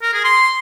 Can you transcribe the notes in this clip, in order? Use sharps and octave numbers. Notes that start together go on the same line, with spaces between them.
A#4
G#4
C6